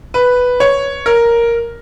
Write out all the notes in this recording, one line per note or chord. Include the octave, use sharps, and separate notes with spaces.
B4
C#5
A#4